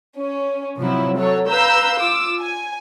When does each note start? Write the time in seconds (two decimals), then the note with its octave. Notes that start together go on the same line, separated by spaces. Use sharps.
0.18 C#4
0.78 C3 F3 F#3 E4
1.17 F#3 A4 C#5
1.48 B4 F5 A#5 E6 G6
1.98 F4 D6 E6
2.40 G#5